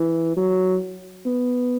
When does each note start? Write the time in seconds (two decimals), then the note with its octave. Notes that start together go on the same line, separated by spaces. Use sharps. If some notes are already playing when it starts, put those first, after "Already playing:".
Already playing: E3
0.37 F#3
1.26 B3